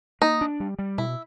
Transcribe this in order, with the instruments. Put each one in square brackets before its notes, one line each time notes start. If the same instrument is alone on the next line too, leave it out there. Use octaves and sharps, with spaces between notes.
[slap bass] A#3 [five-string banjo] D#4
[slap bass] D4
G3
G3
[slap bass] B2 [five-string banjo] E4